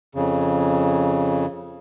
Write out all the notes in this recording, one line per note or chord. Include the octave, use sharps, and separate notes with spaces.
F2 C#3